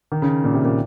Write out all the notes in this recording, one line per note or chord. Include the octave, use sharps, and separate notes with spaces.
D#3
C#3
A#2
C3
A#2